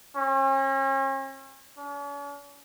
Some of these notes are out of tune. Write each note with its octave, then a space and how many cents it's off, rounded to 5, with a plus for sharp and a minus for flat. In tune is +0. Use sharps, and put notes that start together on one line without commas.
C#4 -40
C#4 +45